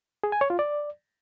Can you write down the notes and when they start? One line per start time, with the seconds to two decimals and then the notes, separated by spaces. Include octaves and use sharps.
0.24 G#4
0.32 G#5
0.41 C#5
0.50 F4
0.59 D5